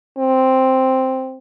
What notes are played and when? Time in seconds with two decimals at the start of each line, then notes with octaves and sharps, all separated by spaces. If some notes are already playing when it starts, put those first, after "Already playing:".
0.18 C4